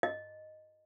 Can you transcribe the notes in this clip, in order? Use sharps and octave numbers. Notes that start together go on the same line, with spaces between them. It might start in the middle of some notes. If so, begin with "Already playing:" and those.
D#5